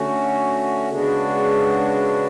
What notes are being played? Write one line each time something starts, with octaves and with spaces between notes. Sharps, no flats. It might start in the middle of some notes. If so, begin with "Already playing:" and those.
Already playing: D3 A3 C#4 F#4
C#3 G#3 B3 D4 F#4